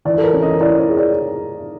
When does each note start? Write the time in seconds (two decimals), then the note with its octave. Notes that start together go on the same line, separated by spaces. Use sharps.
0.05 E3 D5
0.18 A4
0.24 A#4
0.34 C#4
0.42 D#5
0.61 E4 D5
0.79 C#5
0.89 G#4
0.98 D5